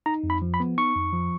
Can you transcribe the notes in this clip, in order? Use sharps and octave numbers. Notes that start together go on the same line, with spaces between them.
D#4 A#5
F2
B5
F3
B5
B3
D#4 C#6
F2
F3